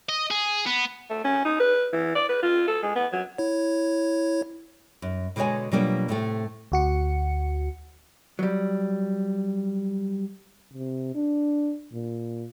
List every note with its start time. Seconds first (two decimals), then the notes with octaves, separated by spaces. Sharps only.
0.09 D#5
0.31 G#4
0.66 B3
1.10 A3
1.24 C#4
1.45 D#4
1.60 B4
1.93 E3
2.15 D5
2.29 B4
2.43 F4
2.68 A4
2.83 G#3
2.95 B3
3.13 F#3
3.38 E4 C#5
5.02 F#2
5.36 B2 D3 G#3 F#4 C#5 G#5
5.71 B2 F#3 G3 A#3 D4 F4
6.09 A2 C3 A3
6.72 D2 F#4 C#7
8.39 F#3 G3
10.74 C3
11.14 D4
11.92 A#2